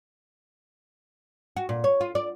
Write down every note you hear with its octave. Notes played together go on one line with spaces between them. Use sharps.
F#4
A#2
C#5
F4
D5